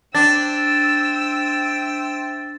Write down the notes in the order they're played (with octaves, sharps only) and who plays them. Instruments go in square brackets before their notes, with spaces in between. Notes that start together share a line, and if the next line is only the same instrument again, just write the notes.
[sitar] D4 [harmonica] C5 E5 G5 [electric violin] E6 [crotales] A6